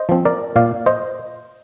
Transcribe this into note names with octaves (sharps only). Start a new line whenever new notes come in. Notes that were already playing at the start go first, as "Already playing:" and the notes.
Already playing: C5 D#5
F3 C4
A#4 D5
A#2 D5 F5
C5 D#5